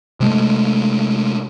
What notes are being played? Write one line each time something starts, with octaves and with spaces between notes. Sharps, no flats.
C3 G#3 A3